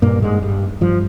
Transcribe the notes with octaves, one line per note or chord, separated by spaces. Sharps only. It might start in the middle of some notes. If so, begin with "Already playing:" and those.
G2 A#2 A#3
G#2 G#3
G2 G3
G2 F3